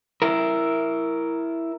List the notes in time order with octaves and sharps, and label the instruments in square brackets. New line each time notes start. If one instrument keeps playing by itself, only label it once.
[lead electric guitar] E4 A#4